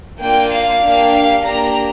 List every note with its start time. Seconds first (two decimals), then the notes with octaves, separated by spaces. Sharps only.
0.19 A#3 D4 F4 G5
0.51 F5
0.82 A#3 D4 G4
1.12 F5
1.43 A#3 D4 G4 A#5